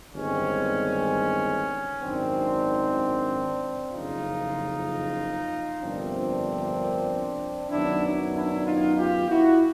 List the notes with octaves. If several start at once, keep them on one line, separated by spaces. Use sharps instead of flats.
G1 G2 D#3 G#3 C4 C#4
G#1 F#2 D#3 C4 D4
F#1 F2 C#3 D#4 F4
G1 F2 C3 F3 A#3 C4 D4
F#2 D#3 F#3 B3 D4 E4
D4 E4
D#4 F4
F4 G4
E4 F#4